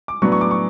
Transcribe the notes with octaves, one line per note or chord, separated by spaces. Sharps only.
D6
A2 F#3 B3 D4 C#6
C#6
D6
C#6